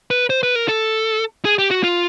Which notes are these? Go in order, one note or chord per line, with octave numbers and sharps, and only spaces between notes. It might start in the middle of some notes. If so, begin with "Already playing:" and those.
B4
C5
B4
A#4
A4
G#4
G4
F#4
F4